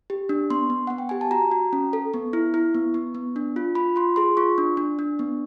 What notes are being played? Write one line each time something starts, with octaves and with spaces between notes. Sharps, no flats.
G4
D4
B3 C6
B3
B3 F#5
G5
G4 G#5
A5
F#4 A#5
F#4
C#4
A4
B3
E4
E4
B3
B3
B3
D4
F4
F4 B5
F4 C6
G#4 C6
F4 C#6
D4
D4
D4
B3